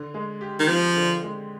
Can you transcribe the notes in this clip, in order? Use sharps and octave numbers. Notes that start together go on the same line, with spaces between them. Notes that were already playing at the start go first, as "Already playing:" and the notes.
Already playing: D3
G#3
G4
D#3
F3 C4
D3
G#3